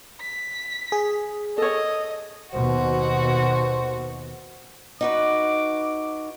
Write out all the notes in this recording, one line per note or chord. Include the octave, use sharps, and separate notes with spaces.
B6
G#4
A4 C#5 D#5
D#2 B2 F#4 C5
D#4 F#4 B4 D6